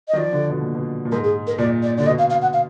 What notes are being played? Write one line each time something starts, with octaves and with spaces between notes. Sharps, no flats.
D#5
D#3
F3 D5
D3
B2
A#2
B2
A#2
G#2 A#4
G#4
A#4
A#2 D5
D5
D3 D5
B2 D#5
F5
F5
F#5
F5